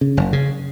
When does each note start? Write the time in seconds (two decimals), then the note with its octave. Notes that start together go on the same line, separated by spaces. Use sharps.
0.01 C#3
0.17 F#1
0.33 C#3